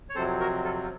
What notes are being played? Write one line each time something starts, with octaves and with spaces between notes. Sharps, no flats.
C#5
F2 C3 F#3 C4 A4 C5
F#4 A#4
F4 A4
F4